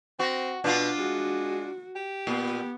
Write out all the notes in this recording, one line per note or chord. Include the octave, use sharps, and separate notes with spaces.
C4 F#4
B2 D4 F4
G#3 F#4
G4
A#2 B3